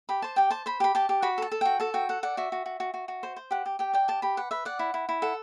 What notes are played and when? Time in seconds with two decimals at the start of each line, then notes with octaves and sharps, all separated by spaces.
0.09 G4 B5
0.22 C5 A5
0.36 G4 G5
0.51 C5 A5
0.66 C5 B5
0.80 G4 B5
0.95 G4 A5
1.09 G4
1.22 F#4 B5
1.38 A4 A5
1.52 A4
1.61 F#4 G5
1.80 A4 A5
1.94 F#4 G5
2.09 A4 F#5
2.23 D5 F#5
2.37 F#4 E5
2.52 F#4
2.66 F#4
2.80 F#4
2.94 F#4
3.08 F#4
3.23 C5
3.36 C5
3.51 G4 F#5
3.66 G4
3.79 G4 G5
3.93 D5 G5
4.08 G4 A5
4.22 G4 B5
4.37 B4 F#5
4.51 B4 E5
4.65 D5 F#5
4.79 E4
4.94 E4
5.09 E4
5.22 A4 F#5